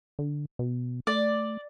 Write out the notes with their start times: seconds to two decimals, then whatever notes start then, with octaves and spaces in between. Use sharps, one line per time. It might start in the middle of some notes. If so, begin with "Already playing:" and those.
0.19 D3
0.59 B2
1.07 A3 D5